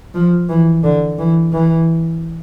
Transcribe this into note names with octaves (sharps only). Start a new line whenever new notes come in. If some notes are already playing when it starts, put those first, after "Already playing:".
F3
E3
D3
E3
E3